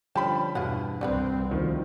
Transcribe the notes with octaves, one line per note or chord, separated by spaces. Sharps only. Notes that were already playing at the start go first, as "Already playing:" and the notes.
D3 F3 G3 C#4 G5 A5 B5
E2 G2 B2 F4 G#4 F#5
C2 G3 B3 C4 B4
D2 D#3 F3